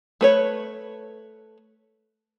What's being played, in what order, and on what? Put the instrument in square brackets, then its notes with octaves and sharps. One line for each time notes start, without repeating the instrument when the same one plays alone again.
[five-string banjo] A3 B4 C#5